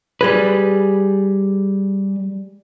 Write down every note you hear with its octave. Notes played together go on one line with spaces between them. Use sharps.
G3 G#4 B4